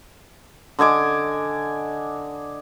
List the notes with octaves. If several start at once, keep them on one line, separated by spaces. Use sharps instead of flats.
D3 D#5 G#5 D6